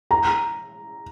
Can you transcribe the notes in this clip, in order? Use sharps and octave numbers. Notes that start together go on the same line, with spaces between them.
A#5